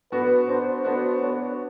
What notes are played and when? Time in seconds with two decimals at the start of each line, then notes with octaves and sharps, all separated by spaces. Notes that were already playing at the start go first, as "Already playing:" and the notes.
0.12 B3 D4 F#4 B4
0.48 B3 D4 F#4 C5
0.85 B3 D4 F#4 C5
1.21 B3 D4 F#4 C#5